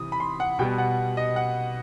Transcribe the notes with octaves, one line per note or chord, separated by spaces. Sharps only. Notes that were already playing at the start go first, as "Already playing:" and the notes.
Already playing: C3 E3 D#6
B5
C6
F#5
B2 G3 B3 G5
F#5
D#5
F#5